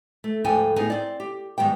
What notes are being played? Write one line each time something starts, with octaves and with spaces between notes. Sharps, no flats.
A3
D2 G#2 F3 A4 G5 G#5
A2 B3 D#4 G#4 G#5
C4 D5
G4
G#2 D#3 G3 B3 G5